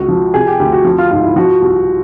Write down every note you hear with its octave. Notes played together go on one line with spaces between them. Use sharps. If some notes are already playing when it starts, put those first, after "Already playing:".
Already playing: C#2 F#4
F3
C3 G#4
G4
D2 G4
F#4
F3
F4
G#2 F4
E4
F3 F#4
C2